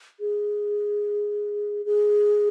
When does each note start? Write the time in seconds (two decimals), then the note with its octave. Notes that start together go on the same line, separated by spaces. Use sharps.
0.20 G#4
1.86 G#4